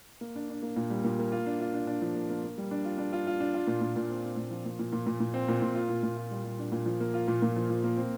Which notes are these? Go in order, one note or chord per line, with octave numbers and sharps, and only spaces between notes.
A#3
D4
D4
A#3
A#2
G3
A#2
A#3
F4
D4
F4
D4
D4
F3
A#3
A#3
A#3
G3
D4
F4
D4
F4
F4
D4
F4
A#2
A#2
A#2
C4
C4
A#2
F3
A#2
A#2
A#2
A#2
A#2
C4
A#2
A#2
F4
A#2
A#2
F4
G3
G3
D4
A#2
F3
A#3
F4
A#2
A#2
F3
F3
A#3
C4